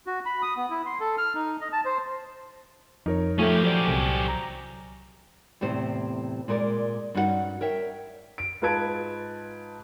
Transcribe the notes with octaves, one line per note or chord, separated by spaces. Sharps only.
F#4
B5
D#6
B3
E4
C6
A4
F6
D#4
D#5
A5
C5
F2 D#4 A#4 C#5
F3 A3 C#4 G4
F#3 C5 D5 D6
C2
A#5
E2 A2 C3 C5
A#2 G#3 A#4 C#5 D5
G2 C#4 D#4 F#4 G#4 F#5
A#4 C#5 E5 G5
D7
G#2 F4 B4 A5 G#6 D7